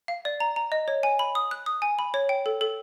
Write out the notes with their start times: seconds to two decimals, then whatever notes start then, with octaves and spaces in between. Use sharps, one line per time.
0.08 F5
0.25 D5
0.40 A#5
0.56 A#5
0.72 D#5
0.88 C#5
1.03 G#5
1.19 B5
1.35 D#6
1.51 F#6
1.66 D#6
1.82 G#5
1.99 B5
2.14 C#5
2.29 G5
2.46 A4
2.61 A4